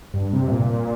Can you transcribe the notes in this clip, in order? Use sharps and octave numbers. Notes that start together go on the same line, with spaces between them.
G2
C3
G2
A#2